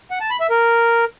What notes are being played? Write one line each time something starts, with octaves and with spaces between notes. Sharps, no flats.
F#5
A5
B5
E5
A#4